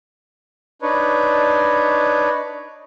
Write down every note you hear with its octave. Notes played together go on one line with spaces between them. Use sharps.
D4 D#4 B4 C#5